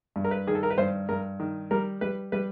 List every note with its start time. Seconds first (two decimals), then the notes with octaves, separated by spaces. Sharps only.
0.16 G2
0.24 A#4
0.31 B4
0.47 D#3 G#4
0.55 A4
0.63 A#4
0.70 B4
0.78 G2 C5
1.09 G2 A#4
1.40 D#3
1.71 G3 A#4
2.01 G3 B4
2.32 G3 B4